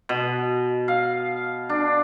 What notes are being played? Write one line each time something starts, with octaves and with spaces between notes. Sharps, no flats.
B2
F5
D4